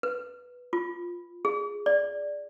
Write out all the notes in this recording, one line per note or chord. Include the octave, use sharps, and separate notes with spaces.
B4
F4
G#4
D5